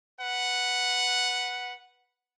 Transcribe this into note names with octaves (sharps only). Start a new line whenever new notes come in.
B4 F#5